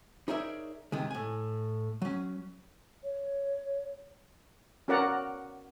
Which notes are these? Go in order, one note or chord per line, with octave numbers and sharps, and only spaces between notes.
D#4 G#4 A#4 C#5 D5 E5
C3 D#3 G#3
A2 G#5
F#3 C#4
C#5
C#4 F#4 A#4 D5 F#5 A#5